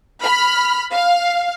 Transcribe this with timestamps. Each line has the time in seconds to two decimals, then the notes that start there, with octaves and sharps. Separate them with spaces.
0.22 B5 F6
0.93 F5